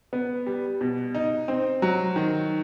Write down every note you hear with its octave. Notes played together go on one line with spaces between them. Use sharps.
B3
G3
B2
D#4
C4
F#3
D#3